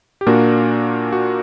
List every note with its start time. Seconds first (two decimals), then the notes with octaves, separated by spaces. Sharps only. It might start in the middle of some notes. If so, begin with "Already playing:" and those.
0.21 G4
0.27 A#2 A#3 D4 F#4 A#4
1.12 F#4